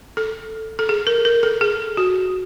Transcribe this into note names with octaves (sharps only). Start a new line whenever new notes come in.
A4
A4
G#4
A#4
A#4
A4
G#4
F#4